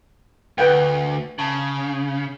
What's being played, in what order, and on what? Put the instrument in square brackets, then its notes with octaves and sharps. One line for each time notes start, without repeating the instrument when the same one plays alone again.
[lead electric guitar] D2 [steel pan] B4 F#5 G5
[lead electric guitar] C#3 [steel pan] A5